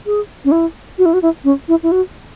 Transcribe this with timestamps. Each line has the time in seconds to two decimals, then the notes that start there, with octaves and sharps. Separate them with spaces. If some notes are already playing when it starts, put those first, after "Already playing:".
0.06 G#4
0.45 C#4
0.52 E4
0.98 F#4
1.05 E4
1.13 F#4
1.22 E4
1.44 C#4
1.68 E4
1.83 E4
1.92 F#4